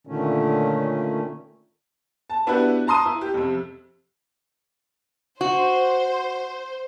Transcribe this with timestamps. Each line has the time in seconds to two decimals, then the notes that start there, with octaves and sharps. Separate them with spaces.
0.07 A#2 D3 D#3 A3 C#4
2.30 A5
2.47 B3 D4 E4 F#4 G4 B4
2.87 A5 A#5 C6 D#6 D#7
3.06 E4
3.21 G4
3.34 F2 C3
5.41 F#4 C5